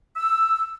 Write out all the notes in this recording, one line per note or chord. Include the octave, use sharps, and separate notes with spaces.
E6